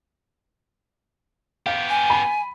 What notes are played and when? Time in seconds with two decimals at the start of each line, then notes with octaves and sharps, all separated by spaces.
1.66 B3 G4 F5
1.89 G#5
2.10 B5